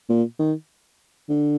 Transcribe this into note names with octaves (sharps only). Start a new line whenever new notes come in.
A#2
D#3
D3